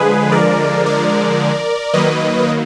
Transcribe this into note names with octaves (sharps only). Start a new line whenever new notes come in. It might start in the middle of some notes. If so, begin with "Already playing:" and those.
Already playing: D3 F3 G#3 G#4 B4
A#4 D5
A#4 D5
D#3 F#3 A#3 B4 D#5